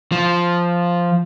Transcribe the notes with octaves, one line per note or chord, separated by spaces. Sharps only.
F3